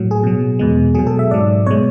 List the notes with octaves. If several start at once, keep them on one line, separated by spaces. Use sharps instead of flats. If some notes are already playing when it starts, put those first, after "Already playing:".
Already playing: A2 F#3
G#4
B2 F#3
E2 B2 G#3
B2 F#3 G#4
A4
E5
G#2 F#3 D5
B2 G#3 C#5